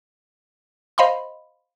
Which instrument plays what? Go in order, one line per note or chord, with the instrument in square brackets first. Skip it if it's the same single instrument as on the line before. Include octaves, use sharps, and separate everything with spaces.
[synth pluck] C5 D#5 F5 B5 C6